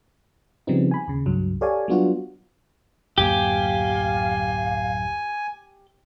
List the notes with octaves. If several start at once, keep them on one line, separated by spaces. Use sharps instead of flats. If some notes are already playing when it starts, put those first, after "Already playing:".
C#3 F3 G3 B3 C4 D#4
G#5 B5
D#2 C#3
C#2 G2 F#3
G4 A4 C#5 D5 F5 G#5
F#3 G3 B3 D4 F4 F#4
D1 F#2 A#3 G4 F5 G#5